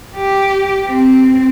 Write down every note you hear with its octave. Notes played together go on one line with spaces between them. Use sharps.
G4
C4